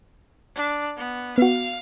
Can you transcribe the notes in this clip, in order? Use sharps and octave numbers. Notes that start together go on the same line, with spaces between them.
D4
B3
B3 F#4 F5